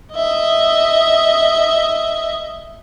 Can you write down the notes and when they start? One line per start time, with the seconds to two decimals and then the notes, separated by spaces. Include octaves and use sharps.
0.14 D#5 E5